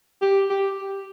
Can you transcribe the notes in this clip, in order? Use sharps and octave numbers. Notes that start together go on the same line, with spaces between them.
G4
G4